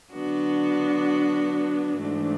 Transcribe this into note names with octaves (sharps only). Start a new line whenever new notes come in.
D3 F#3 B3 D4 F#4
G#2 E3 A3 D4